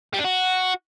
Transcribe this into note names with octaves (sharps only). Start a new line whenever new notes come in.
G3
D4
F#4